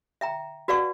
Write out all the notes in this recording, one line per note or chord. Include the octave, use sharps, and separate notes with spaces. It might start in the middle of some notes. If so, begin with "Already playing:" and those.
E5 G5 A#5
F#4 B4 D5 F5 F#5 C#6